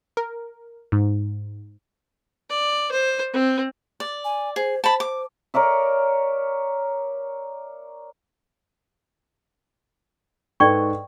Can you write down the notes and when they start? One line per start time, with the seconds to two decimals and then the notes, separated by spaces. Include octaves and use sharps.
0.17 A#4
0.92 G#2
2.50 D5
2.92 C5
3.33 C4
4.00 D5
4.24 G#5
4.56 G#4 C5
4.84 C5 A5 B5
5.00 D6
5.54 A#4 C#5 D5 E5
10.60 G#2 A4 B4 D5 G5 C#6